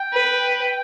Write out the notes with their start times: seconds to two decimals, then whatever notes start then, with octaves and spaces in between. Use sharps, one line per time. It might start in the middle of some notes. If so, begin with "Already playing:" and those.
Already playing: G5
0.14 B4